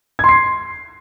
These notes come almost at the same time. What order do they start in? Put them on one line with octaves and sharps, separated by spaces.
G#6 C6 C7